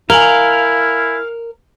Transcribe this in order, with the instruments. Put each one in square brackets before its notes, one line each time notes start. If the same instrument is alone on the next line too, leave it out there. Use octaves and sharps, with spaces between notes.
[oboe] E4 [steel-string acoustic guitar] A#4 [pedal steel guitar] F5 [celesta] G#5 F#7 G7